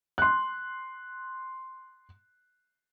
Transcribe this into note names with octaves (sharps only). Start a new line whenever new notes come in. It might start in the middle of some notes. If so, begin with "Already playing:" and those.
C6 F#6